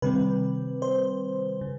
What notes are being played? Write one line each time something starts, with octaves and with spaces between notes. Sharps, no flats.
C3 D#3 G3 C4 B4
C5
C#3